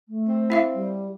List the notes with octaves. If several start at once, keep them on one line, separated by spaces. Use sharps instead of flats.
A3
C4
E4 E5 F5
G3